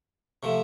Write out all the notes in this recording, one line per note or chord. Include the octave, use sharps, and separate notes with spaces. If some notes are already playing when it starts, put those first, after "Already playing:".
C3 F3 A3